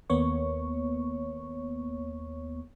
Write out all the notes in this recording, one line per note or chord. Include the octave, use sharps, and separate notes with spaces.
D#2 A#3 B3 C#5 C#6